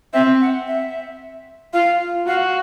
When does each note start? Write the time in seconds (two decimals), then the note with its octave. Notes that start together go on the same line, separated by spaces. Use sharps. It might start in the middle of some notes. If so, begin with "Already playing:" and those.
0.13 C4 E5
0.41 F#5
0.68 E5
1.74 F4 F5
2.27 F#4 F5